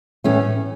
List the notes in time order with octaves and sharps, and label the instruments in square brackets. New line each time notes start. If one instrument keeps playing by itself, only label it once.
[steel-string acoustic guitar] A2 E3 A3 C#4